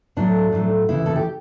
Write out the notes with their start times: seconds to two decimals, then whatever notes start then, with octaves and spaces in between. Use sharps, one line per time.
0.16 A2 F#3 A3 D4
0.52 A2 F#3 A3
0.89 D2 C#3 E3 E4
1.06 A4
1.16 G4